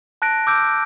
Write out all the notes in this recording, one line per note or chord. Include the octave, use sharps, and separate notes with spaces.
A5 F#6 A#6 D7
D6 E6 G6 D7